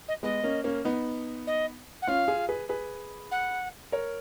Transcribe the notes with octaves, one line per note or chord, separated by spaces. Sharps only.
D#5
G#3 B3 D#5
A#3 C#4
A#3 C#4
B3 D#4
D#5
F#5
C#4 F4 F5
F4 G#4
G#4 B4
G#4 B4
F#5
A#4 C#5